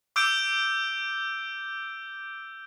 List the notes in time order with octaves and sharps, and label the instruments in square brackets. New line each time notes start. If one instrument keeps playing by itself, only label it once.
[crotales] D6 E6 G6 D7